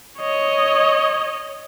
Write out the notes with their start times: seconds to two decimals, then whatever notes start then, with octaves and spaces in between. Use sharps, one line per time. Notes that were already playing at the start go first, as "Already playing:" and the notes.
0.19 C#5 D#5